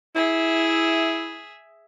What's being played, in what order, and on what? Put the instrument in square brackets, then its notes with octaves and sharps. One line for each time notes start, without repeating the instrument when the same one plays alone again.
[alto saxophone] E4 [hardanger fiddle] G#4 E5